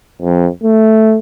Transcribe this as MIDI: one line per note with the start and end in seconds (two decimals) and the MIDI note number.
0.22 0.48 41
0.63 1.18 57